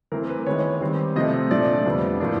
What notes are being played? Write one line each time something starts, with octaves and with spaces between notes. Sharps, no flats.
E3 A3 C4 A#4
B4
D#3 G#3 B3 E4 C#5
D#3 G3 C4
C3 F3 A3 C4 D#5
A#2 F3 A3 D4 D5
F2 D3 G3 B3
A2 F3 A#3 D4